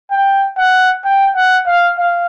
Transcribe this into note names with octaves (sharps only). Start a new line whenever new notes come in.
G5
F#5
G5
F#5
F5
F5